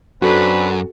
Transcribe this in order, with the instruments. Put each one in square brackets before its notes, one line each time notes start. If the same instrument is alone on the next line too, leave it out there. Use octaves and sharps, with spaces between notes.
[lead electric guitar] F#2 [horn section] C4 D4 B4 [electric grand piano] F#4 A4